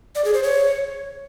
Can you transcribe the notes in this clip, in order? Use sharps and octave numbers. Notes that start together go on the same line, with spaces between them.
D5
G#4
C5
C#5